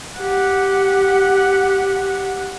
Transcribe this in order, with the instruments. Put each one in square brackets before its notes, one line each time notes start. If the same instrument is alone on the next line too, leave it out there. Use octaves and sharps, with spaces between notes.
[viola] G4 F#5